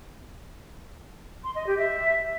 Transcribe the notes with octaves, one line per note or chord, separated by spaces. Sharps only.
C6
D#5
G4
E5